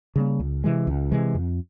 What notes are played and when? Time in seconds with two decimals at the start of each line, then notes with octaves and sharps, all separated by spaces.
0.16 C#3 G3 A#3
0.40 C#2
0.64 C3 E3 G#3
0.87 C#2
1.11 C3 E3 G#3
1.35 F2